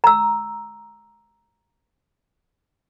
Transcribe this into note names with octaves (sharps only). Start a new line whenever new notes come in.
A#5 E6